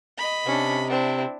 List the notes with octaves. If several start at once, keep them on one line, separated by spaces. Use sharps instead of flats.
D#5 B5
C3 C#4 D4
C4 D4 E4